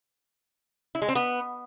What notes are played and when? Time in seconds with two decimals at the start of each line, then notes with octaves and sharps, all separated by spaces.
0.95 E4
1.02 G#3
1.09 C4
1.15 B3